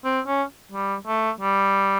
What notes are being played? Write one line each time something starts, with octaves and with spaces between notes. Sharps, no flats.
C4
C#4
G3
A3
G3